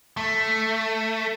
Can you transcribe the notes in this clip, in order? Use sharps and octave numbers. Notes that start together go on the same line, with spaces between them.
A3